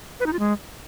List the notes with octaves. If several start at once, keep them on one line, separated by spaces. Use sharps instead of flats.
B4
D#4
F4
G#3